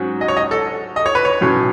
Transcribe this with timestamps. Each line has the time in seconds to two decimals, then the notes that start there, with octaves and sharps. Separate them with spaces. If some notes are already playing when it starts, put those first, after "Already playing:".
Already playing: G#2 F#3 C#4 F#4
0.21 D#5
0.28 C#5
0.37 D#5
0.51 A4
0.96 D#5
1.06 C#5
1.15 B4
1.25 C#5
1.41 B1 A2 F#3 C#4